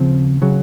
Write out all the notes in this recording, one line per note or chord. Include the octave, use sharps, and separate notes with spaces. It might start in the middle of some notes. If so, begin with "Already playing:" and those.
Already playing: D#2 C#3 F3 C4
C#3 F#3